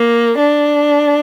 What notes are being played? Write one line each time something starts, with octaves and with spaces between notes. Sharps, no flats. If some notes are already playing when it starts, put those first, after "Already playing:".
Already playing: A#3
D4